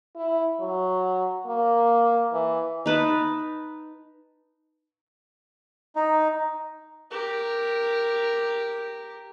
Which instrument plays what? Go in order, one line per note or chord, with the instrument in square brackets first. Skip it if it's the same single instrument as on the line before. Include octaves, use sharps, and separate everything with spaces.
[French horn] E4
F#3
A#3
E3
[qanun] D#4 B4 A5
[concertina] D#4
[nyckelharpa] G4 A#4